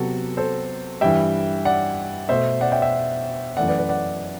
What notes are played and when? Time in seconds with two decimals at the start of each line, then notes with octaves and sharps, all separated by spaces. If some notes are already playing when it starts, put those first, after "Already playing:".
Already playing: C3 F#3 B3 F#4 A4
0.37 A4 C5
1.01 G2 E3 G3 E5 G5
1.65 D5 F#5
2.29 B2 A3 C5 E5
2.61 D5 F#5
2.72 E5 G5
2.82 E5 G5
3.57 F#2 E3 A3 D5 F#5
3.68 B4 D5
3.78 B4 D5
3.89 D5 F#5